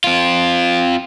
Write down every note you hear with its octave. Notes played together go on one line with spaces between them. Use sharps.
C4 F4